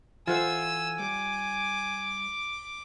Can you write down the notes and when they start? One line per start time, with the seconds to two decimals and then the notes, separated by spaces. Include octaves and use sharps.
0.27 E3 F4 A4 C5 E5 F#5 G#5 E6
0.99 G3 D6